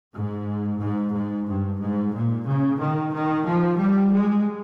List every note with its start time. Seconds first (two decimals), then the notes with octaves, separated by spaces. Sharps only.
0.14 G#2
0.80 G#2
1.14 G#2
1.47 G2
1.81 G#2
2.14 A#2
2.47 C#3
2.80 D#3
3.14 D#3
3.47 F3
3.80 G3
4.13 G#3